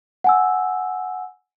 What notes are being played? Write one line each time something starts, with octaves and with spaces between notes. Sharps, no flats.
F#5 G#5 E6